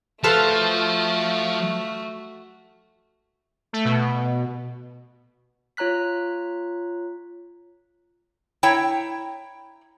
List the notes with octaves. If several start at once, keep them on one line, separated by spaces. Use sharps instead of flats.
F3 A3 F4 F#4 A4 B4 A5 F6
A3
B2
F4 C#5 A#5 F#6 B6
E4 C#5 G5 A#5